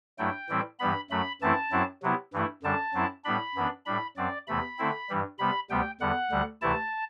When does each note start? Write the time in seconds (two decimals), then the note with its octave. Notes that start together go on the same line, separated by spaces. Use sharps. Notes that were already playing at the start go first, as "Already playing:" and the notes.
0.18 G2 F#3 A3 E4 G5
0.49 A2 E3 G3 C4 E4
0.79 G2 E3 G3 B3 B5
1.10 F#2 F#3 A3 B5
1.42 F#2 E3 A3 C4 E4 A5
1.72 F#2 F#3 C4 E4
2.03 C3 F#3 B3 E4
2.33 G2 E3 A3 E4
2.63 F#2 D3 G3 D4 A5
2.94 F#2 F#3 C4 E4
3.25 A2 G3 B3 D4 B5
3.55 F#2 E3 B3 D4
3.86 A2 G3 D4 B5
4.17 F#2 F#3 C4 D5
4.47 E2 C3 E3 A3 B5
4.78 D3 A3 C4 E4
5.09 G2 E3 G3
5.39 C3 G3 B3 B5
5.70 D2 C3 G3 B3 G5
6.01 E2 D3 G3 F#5
6.31 D2 D3 G3
6.61 D2 C3 E3 A3 E4 A5